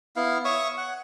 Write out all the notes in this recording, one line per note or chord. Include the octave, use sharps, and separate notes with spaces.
B3 E4 F5
C#5 E5 C#6 D#6
F#5